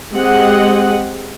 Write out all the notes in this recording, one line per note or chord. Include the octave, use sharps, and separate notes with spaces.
G#3 C4 G4 G#4 D#5 F#5